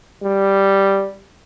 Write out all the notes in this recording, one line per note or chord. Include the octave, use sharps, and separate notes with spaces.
G3